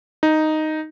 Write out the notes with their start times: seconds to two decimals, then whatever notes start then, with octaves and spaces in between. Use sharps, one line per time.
0.23 D#4